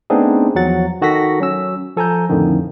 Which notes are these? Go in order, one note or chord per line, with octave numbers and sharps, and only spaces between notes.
A3 B3 C4 D4 D#4 G#4
E2 F3 F#3 F#5 A6
D#3 F#4 A4 A#6 B6
F#3 C#4 E6
F3 A4 G#5 A#5 G6
F2 A2 D3 D#3